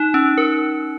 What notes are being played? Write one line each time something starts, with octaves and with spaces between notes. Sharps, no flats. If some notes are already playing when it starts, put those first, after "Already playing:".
Already playing: D#4
C#4
A#4